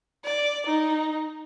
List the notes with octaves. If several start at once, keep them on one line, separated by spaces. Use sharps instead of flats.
D5
D#4